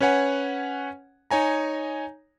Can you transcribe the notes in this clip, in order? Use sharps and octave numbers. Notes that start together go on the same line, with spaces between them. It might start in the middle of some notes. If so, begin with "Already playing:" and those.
C#4 B4 C#5 F#5 G#5
D#4 C#5 G#5 A#5